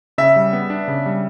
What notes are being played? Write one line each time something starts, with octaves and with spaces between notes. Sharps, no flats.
C#3 E5
G3
B3
D4
C#3
G3